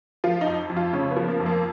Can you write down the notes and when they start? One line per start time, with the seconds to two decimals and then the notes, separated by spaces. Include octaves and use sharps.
0.24 F3 F4
0.41 D#4
0.46 F2
0.70 F2
0.76 F4
0.93 C#3 C#4
1.11 B3
1.16 F3
1.28 A#3
1.40 F2
1.46 A#3